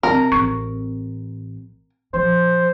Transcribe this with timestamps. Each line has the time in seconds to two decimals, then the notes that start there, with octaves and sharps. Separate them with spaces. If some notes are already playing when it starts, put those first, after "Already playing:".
0.03 C3 C4 D4 A#4
0.32 A1 C4 C#6
2.14 A#1 F3 C5